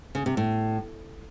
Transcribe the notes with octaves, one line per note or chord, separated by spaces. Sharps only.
C#3
C3
A2